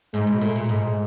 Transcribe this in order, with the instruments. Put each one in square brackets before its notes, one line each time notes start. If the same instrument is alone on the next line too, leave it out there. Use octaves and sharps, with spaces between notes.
[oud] G#2 [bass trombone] G#3
[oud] B2
[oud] A#2 [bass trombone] A3
[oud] A#2
[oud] G#2 [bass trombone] G#3